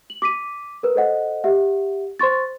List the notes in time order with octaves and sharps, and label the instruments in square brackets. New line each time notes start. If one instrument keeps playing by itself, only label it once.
[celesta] F#7
D6 B6 D#7
A#4 B4
A4 C5 D#5 F#5
G4 E5 F#5
C5 C6 C#6 A6